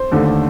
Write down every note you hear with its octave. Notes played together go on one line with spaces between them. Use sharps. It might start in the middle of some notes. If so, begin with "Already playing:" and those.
Already playing: C5
D#2 D3 A3